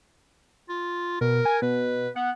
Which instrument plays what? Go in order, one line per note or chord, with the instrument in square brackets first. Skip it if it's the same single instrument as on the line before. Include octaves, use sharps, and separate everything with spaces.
[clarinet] F4
[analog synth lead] B2 [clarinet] A#4
[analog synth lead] G#5
[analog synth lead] B2 [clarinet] B4
[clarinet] B3 [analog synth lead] F#5